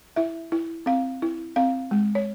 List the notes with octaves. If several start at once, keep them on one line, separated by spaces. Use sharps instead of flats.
E4 E5
E4
C4 F5
E4
C4 F5
G#3
C#5